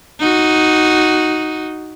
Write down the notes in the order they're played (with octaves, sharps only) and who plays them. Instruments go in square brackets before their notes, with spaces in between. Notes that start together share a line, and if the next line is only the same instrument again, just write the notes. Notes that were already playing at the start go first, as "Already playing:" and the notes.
[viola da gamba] D#4 F#4